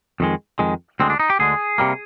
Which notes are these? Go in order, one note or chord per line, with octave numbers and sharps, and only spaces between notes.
F2 D#3 G#3
F2 D#3 G#3
D2 D3 G#3 C4
D4
D#4
G4
D2 D3 G#3 G#4
C3 G3 A#3